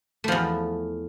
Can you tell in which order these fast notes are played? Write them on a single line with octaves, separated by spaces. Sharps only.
A3 F3 E2